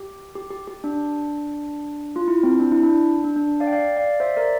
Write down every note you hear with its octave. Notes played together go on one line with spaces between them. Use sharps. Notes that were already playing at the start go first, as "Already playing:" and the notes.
Already playing: G4
G4
G4
G4
D4
F4
E4
C4
D4
E4
D4
D4
D4
D5 F5
G5
D5 F5
D5 F5
C5 E5
A#4 D5